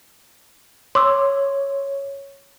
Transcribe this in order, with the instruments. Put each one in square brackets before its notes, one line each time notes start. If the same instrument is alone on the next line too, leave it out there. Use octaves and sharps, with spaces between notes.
[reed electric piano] C#5 [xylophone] C6 D6 E6